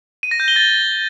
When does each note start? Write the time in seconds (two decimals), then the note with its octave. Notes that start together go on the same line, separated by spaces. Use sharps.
0.23 D#7
0.31 A#6
0.40 G6
0.48 G7
0.56 A6